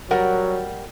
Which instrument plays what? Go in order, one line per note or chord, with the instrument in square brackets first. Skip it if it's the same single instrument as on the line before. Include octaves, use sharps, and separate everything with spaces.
[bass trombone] F#3 [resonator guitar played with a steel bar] G3 A#4 F#5